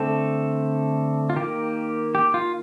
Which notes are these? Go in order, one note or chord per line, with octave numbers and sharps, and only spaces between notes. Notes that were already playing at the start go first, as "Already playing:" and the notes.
Already playing: D3 A3 C4 A4
F4
D#3 A#3 G4
G4
F4